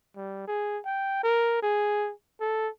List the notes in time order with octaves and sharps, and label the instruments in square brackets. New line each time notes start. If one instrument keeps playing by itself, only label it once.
[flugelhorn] G3
G#4
G5
A#4
G#4
A4